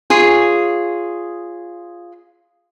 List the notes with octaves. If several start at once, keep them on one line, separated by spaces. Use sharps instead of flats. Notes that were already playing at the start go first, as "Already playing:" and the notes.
F4 G#4 C#5